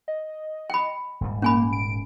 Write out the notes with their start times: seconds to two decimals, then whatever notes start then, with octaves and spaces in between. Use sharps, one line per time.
0.08 D#5
0.70 G5 B5
1.21 D#1 G#2 G3
1.42 A#3 C#4 G#5 B5
1.73 D7